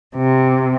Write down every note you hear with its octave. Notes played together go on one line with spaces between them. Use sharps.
C3